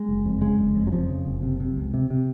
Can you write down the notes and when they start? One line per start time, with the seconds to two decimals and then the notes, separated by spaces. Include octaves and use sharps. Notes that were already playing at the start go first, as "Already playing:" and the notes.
Already playing: G#3
0.09 F#1
0.25 F2
0.41 C#3 G#3
0.58 F#1
0.75 F2
0.87 F#3
0.92 F2 F3
1.09 C#3
1.26 F#1
1.42 C3
1.60 C3
1.77 C#2
1.94 C3
2.10 C3